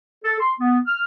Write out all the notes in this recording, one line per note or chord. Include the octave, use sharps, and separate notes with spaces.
A4
C6
B3
F6